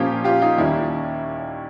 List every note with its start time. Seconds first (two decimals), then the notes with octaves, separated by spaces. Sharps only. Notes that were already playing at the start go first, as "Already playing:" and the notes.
Already playing: A#2 F3 A#3 C#4 F4 G4
0.24 F4 G4
0.41 D#4 F4
0.58 D#2 D#3 G3 A#3 C#4 E4